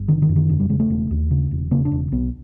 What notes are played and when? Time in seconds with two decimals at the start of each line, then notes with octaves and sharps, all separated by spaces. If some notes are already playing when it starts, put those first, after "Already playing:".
Already playing: G1
0.08 D3 D#3
0.22 D#3
0.29 F#2
0.36 D#3
0.49 E1 D3
0.60 G3
0.69 C#3 G#3
0.80 A3
0.90 E1
1.11 D#2
1.31 C#3
1.51 E1
1.71 C#3 A#3
1.85 D4
1.92 E1
2.12 B1 B3